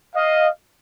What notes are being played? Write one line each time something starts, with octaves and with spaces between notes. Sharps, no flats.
D#5 F5